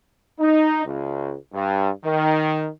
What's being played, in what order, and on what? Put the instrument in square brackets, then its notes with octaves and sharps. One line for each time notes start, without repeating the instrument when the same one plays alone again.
[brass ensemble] D#4
C#2
G2
D#3